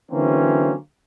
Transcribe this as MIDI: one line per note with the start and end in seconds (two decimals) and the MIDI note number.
0.12 0.75 50
0.12 0.75 52
0.12 0.75 54
0.12 0.75 58
0.12 0.75 60
0.12 0.75 61